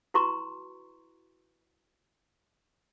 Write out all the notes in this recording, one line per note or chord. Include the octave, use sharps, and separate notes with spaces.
E4 F#4 B4 A#5 C6 C#6